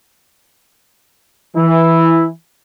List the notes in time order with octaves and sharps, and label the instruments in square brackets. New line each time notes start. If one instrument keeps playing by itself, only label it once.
[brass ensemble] E3 [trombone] E4